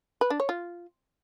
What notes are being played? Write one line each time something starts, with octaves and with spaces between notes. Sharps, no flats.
B4
D4
C#5
F4